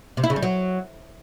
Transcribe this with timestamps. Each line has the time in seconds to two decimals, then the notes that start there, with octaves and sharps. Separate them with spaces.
0.17 C3
0.24 E4
0.30 C#3
0.36 G3
0.43 F#3